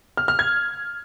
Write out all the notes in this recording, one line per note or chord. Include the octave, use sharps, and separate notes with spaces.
F6
F6
G#6